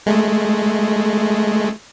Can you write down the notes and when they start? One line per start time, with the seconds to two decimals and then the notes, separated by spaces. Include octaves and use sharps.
0.06 G#3 A3